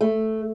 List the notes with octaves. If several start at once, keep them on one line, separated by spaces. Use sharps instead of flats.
A3